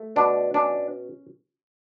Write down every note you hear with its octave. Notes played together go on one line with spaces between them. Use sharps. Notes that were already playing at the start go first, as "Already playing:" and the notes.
Already playing: A3
B2 D4
C#4 D4